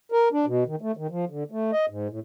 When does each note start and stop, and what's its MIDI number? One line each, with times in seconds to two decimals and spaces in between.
0.12 0.29 70
0.32 0.46 62
0.46 0.64 47
0.66 0.76 51
0.81 0.92 57
0.97 1.07 51
1.10 1.25 53
1.30 1.44 50
1.51 1.71 57
1.72 1.86 75
1.89 2.08 44
2.09 2.20 45